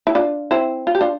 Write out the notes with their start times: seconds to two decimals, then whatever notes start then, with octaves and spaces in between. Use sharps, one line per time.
0.07 E4
0.15 D4 F4
0.51 C4 E4
0.87 F4
0.95 G4
1.01 D4 F4